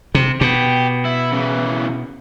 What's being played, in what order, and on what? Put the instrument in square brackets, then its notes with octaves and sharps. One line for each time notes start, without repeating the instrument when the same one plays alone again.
[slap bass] C3
[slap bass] B2 [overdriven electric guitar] G4
[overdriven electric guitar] E4
C#3 E3